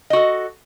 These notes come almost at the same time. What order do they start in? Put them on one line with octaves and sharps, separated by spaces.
D#5 F#4 A4